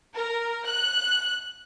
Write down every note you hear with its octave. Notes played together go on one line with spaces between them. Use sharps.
A#4
F#6